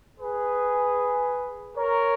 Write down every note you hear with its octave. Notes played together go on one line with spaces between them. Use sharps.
G#4 B4
A#4 C#5